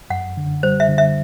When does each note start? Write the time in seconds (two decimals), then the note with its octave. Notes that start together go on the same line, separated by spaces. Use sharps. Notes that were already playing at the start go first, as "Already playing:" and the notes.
0.10 F#2 F#5
0.37 D3
0.63 G3 C5
0.80 E5
0.89 D3
0.98 E5